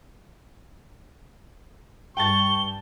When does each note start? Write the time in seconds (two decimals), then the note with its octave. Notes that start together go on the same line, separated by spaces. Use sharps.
2.17 G2 G5 A5 C#6 A6 G7